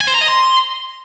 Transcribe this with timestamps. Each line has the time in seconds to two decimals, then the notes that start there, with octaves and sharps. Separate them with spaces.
0.01 G#5
0.08 C5
0.15 A#5
0.22 D#5
0.28 C6